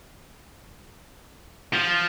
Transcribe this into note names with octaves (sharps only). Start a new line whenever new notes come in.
F3